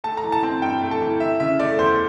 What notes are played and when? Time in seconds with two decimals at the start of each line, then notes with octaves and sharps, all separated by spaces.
0.04 A3 A5
0.17 A#5
0.24 E3
0.32 A5
0.43 C4
0.62 G2 G5
0.81 A3
0.91 A5
1.01 E3
1.20 E3 E5
1.40 C#3 E5
1.59 A3 D5
1.79 E2 C5